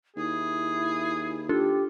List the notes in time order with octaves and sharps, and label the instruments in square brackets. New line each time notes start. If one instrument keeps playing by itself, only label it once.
[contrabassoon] D#2 [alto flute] E4 [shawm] G#4
[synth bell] D4 F4 A4 [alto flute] G4